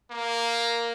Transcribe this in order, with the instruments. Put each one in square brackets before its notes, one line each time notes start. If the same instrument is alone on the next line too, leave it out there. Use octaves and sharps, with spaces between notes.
[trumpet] A#3